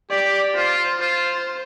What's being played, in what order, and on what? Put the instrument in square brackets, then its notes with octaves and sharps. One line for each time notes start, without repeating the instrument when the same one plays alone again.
[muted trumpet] G4 [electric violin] D5
[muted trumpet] F4 [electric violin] C5
[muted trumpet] F4 [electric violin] C5